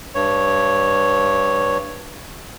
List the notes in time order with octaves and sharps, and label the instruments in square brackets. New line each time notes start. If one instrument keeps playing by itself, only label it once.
[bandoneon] G2 C#5